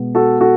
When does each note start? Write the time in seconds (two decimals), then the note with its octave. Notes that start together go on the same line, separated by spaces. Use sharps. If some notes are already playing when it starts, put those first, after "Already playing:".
Already playing: B2 G#3 B3
0.15 F#4 A4
0.41 F#4 A4